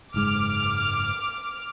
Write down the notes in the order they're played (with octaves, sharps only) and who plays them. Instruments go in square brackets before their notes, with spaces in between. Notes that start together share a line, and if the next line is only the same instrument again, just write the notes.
[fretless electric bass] F#1 G#2 G#3 [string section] D6 F6